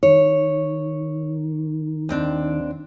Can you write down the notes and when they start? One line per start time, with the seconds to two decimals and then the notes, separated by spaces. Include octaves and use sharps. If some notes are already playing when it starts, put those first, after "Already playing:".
0.03 D#3 C#5
2.09 D#2 C4 D4